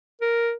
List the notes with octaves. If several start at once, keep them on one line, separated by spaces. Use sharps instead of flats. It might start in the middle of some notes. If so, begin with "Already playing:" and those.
A#4